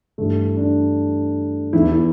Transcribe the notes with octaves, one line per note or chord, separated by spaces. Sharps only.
G2 E3 A3
D4
E2 E3 E4
E4